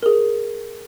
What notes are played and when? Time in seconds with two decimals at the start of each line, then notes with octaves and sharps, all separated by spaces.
0.03 G#4 A#4